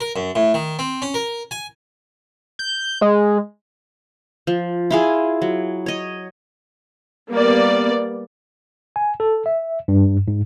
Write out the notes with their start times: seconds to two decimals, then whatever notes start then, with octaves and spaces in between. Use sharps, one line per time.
0.01 A#4
0.16 F#2
0.35 A2
0.54 D#3
0.79 C4
1.02 C#4
1.14 A#4
1.51 G#5
2.59 G6
3.01 G#3
4.47 F3
4.90 E4 F4 G#4
5.42 F#3
5.86 C#5 D#5
7.32 G3 A#3 B3 D5
8.96 G#5
9.20 A4
9.46 E5
9.88 G2
10.28 G#2